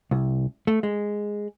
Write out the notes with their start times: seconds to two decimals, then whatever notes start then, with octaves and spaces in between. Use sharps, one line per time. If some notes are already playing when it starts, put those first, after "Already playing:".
0.11 C2
0.67 A3
0.83 G#3